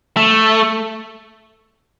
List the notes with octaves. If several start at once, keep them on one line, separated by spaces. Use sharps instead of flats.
A3